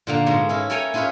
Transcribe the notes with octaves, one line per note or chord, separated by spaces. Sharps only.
A#2 D3 A#3
G#2 B2 G#3
C#4 E4 A4
A4 A#4 C#5 G5 G#5 A#5
C#4 E4 F4 G#4 B4 C#5